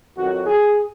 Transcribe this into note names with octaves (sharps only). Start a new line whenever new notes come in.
F2 D#3 F#3 F#4
G#4